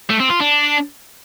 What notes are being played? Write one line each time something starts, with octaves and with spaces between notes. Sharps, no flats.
A3
C4
F4
D4